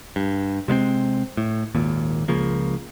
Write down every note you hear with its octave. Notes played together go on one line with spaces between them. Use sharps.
G2
C3 G#3 B3 C4
A2
G#1 D#2 A#2
C#2 C#3 F3 A#3